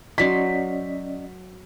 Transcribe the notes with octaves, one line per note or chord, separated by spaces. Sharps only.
F#3 C#4 D5 D#5 C6 B6